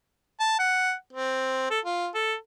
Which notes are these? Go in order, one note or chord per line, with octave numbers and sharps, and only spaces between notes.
A5
F#5
C4
A4
F4
A4